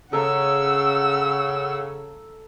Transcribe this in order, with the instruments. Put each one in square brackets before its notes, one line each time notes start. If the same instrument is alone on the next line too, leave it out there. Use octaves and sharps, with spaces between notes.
[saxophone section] C#3 [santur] A4 A#5 [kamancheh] F#5 E6